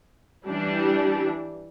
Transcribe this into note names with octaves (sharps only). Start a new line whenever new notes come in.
E3 G3 D4